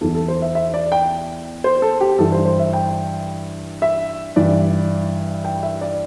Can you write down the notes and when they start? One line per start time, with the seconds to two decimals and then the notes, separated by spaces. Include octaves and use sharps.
0.01 E2 E3 A4
0.15 A4
0.28 C5
0.42 E5
0.55 E5
0.74 D5
0.92 G5
1.64 C5
1.82 A4
2.01 G4
2.18 G2 E3 A4
2.32 C5
2.45 C5
2.60 E5
2.73 G5
3.82 E5
4.36 G2 E3 D5
5.45 G5
5.63 E5
5.81 D5